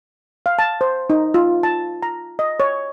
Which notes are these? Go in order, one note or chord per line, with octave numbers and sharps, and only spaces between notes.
F5
A5
C5
D#4
F4
A5
A#5
D#5
C#5